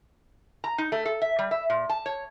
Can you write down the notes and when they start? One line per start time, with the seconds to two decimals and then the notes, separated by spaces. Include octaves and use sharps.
0.64 A#5
0.78 D#4
0.92 A3
1.05 A4
1.22 E5
1.39 G3
1.51 E5
1.70 A#2
1.89 A5
2.06 C#5